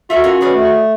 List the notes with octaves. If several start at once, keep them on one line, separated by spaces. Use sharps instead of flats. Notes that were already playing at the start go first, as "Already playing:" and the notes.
D#3 F#4 A4 E5
C#4 F4 A#4
D#3 C#4 G#4 B4 D5
A3